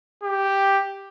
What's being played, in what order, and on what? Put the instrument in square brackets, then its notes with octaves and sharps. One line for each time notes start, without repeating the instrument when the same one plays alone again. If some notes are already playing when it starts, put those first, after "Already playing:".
[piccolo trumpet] G4